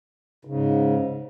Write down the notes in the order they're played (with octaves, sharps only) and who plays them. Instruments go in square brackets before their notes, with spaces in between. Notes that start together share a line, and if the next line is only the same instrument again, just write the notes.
[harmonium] G#2 C#3